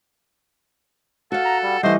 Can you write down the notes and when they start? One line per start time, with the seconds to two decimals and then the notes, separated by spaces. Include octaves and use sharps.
1.32 F#4 A4 F5 F#5
1.45 A#5
1.63 G3
1.83 E3 G3 A3 C5 D#5